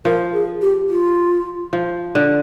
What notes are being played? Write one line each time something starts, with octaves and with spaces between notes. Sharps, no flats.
F3 A#4
G#4
G4
F4
F3
D3